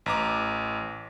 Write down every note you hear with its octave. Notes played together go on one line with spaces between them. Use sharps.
A1 A#5 D6